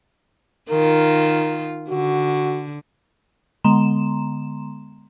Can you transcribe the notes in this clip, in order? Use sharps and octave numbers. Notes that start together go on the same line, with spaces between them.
D#3 F4 A#4
D3 F#4
D3 G#3 B3 A#5 C6 E7